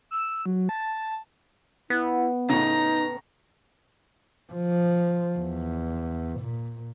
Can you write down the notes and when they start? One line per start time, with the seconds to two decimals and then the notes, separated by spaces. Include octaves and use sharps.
0.11 E6
0.46 F#3
0.69 A5
1.90 B3 E4
2.50 A2 C#3 D#4 A#5
4.53 F3
5.38 E2
6.39 A#2